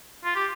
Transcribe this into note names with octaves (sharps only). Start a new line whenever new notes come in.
F4
G4